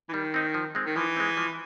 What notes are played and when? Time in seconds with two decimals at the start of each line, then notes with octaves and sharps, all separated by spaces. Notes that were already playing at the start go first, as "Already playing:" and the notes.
0.09 E3
0.13 D#3 G3
0.34 C4 D#4
0.54 F3
0.75 G#3 C4
0.86 D#3
0.96 E3 F3
1.17 G#3 C4
1.37 F3